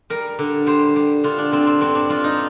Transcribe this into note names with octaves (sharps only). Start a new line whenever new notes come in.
G3 A#4
D3
G3 C5
G3
D3 F4
D4
D3 C4
C4
G2 C4
D4
G2 F4
D#4